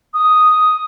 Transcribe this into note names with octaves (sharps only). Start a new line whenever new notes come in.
D#6